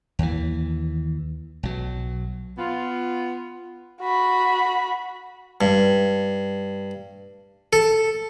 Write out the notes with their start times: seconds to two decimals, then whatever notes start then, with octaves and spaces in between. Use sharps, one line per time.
0.19 D#2 E3
1.63 B1 F#3
2.58 B3 F4
4.01 F#4 B5
5.61 G2
7.73 A4